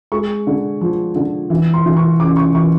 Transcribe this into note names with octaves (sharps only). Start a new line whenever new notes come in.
G#3 C#6
D3
F3
D3
E3
C6
E3
C#6
C#3 D6
C#6
E3 C#6